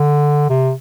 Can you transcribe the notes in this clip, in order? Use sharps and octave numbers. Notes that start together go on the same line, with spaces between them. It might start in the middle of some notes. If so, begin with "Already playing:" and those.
Already playing: D3
C3